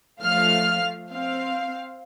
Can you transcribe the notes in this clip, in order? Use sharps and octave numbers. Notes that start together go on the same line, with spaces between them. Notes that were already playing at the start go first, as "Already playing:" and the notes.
F3 A3 F5 F6
C4 F5